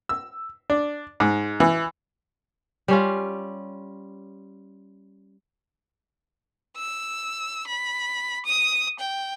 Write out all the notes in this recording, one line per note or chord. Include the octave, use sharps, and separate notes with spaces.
E6
D4
G#2
E3
G3 C#4 F4
E6
B5
D#6
G5